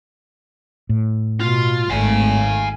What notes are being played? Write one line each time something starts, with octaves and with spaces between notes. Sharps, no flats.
A2
B2 F4
G#1 A3 F5 G#5